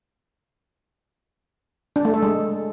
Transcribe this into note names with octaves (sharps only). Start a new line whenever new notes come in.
D4
A3
A4
G#3